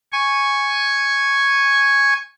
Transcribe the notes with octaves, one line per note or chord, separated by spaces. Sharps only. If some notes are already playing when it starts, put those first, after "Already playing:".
G#5 C#6